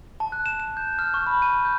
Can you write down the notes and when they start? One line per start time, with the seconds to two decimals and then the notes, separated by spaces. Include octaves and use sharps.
0.20 A5
0.32 F#6
0.46 E7
0.60 E7
0.77 G6
0.99 F6
1.14 C#6
1.27 B5
1.42 D#7
1.65 G6